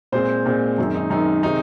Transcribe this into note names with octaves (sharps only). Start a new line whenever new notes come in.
A#2 G#3 C4 C5
A#2 G#3 C4
F#2 D#3 G#3 C4
D#4
F#2 D#3 G#3 C4 D#4
C3 D#3 G#3 C4 D#4